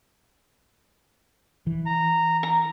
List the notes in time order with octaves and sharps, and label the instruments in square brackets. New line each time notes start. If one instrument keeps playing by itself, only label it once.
[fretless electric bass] E3
[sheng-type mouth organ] A#5
[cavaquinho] A#5